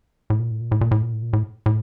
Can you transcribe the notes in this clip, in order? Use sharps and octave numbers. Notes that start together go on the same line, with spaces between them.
A2
A#2
A2
A#2
A2
A#2
A2
A#2
A2
A#2
A2
A2